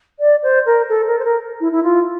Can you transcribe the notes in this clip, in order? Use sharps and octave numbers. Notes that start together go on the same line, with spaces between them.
D5
C5
A#4
A4
A#4
C5
A#4
E4
E4
F4